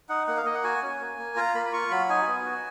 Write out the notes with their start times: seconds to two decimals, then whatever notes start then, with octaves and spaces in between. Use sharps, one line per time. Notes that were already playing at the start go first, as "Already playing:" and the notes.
0.09 D#4 F#5
0.27 A#3 F#5
0.37 F5
0.45 A#3 D#5
0.55 F#5
0.64 F#4 G#5
0.82 C#4
1.00 A#3
1.18 A#3
1.36 F4 A#5
1.55 A#3 B5
1.66 B5
1.73 F4 C#6
1.91 F#3 B5
2.09 D#4 G#5
2.27 B3
2.45 F#4